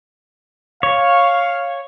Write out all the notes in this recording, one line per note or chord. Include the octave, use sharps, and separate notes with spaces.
C#5 F5